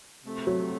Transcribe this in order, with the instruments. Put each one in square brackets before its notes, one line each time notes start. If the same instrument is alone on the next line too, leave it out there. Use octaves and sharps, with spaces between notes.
[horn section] C3 F3 A3 C4
[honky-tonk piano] F#3